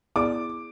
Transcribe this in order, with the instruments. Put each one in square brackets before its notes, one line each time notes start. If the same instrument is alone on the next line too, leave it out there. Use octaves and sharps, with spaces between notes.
[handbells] B3 E4 G#4 D5 [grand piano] D6